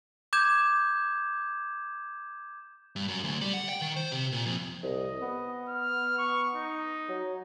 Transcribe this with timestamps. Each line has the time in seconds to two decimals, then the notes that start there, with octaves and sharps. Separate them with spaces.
0.33 D6 G6 G#6 E7
2.96 G2
3.08 F#2
3.24 D2
3.41 G3
3.53 F#5
3.69 G5
3.82 D#3
3.96 C5
4.12 C3
4.32 A#2
4.46 F2
4.83 C2 D#5
5.22 B3
5.68 F6
6.18 C#6
6.55 D#4
7.09 F#3